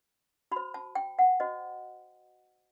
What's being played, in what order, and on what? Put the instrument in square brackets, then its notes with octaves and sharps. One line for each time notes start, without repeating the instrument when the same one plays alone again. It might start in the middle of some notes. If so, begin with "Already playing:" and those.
[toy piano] F#4 C5 B5
A5
G5
F#5
F#4 C5 D#5